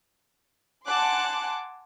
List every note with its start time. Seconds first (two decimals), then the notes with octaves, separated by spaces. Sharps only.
0.86 F#5 G#5 A5 C6 D6 F#6